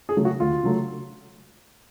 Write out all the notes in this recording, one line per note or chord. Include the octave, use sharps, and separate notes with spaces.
G#4
C#3 F#3 A3
F#4
D2 F4
C#3 F#3 A3